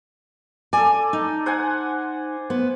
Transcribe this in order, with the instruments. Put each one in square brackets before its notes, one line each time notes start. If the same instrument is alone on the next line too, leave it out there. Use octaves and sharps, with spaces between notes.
[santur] A4 D5 [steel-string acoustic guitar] G#5
[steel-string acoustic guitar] D#4
[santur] C5 F#5 G#5
[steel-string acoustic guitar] B3 [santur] C5